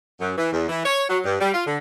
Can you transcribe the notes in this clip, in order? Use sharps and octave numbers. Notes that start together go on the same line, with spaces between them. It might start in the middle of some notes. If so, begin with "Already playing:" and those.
F#2
E3
E2
E3
C#5
F#3
G2
G3
F4
D3